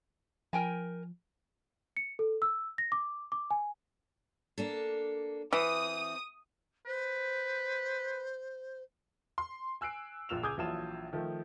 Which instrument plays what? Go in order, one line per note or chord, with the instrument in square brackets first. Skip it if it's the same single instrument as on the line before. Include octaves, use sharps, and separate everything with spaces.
[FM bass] F3 [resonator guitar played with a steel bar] A#4 G5 G#5
[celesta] C#7
A4
E6
A#6
D6
D6
G#5
[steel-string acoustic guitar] A#3 D4 A4
[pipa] E3 [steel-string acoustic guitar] C4 [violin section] D#6
[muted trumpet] B4 [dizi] C5
[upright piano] C6
G#5 E6 F#6 C7 D7
A#1 A#2 F4 E6 E7 F7
C#2 G#4 D6 D#6 G6 G#6
A#1 E3 F#3 F4 A5 E7
D#3 F3 A3